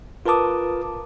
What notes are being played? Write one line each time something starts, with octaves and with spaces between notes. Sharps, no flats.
F4 A#4 B4 A5 D6 D#6